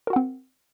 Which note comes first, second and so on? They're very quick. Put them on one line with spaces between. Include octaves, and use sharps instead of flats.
A#4 F#4 F#5 C4